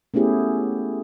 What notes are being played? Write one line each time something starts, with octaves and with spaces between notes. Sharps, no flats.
A3 B3 C#4 E4 G4 G#4